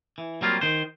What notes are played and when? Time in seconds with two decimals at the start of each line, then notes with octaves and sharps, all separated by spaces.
0.18 E3
0.42 F#3 G3 A#3 C4 F4
0.61 D#3 C5